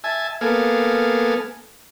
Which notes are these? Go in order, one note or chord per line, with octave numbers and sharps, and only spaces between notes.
E5 G#5 A5
A#3 B3 A4 F5 G#5